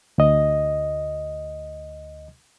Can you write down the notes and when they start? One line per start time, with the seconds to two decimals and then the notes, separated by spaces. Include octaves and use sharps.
0.18 D2 D#5